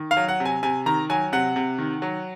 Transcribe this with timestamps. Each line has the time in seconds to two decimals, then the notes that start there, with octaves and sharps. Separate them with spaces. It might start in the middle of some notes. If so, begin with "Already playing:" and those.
Already playing: D#3
0.11 F5
0.17 F#3
0.28 F#5
0.40 C3
0.45 G#5
0.63 C3 G#5
0.86 D#3 A#5
1.10 F#3 G#5
1.32 C3 F#5
1.56 C3
1.78 D#3
2.02 F#3